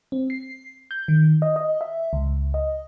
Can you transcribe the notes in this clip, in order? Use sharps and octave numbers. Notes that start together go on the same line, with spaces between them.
C4
C7
G6
D#3
D#5
D#5
E5
C#2
D#5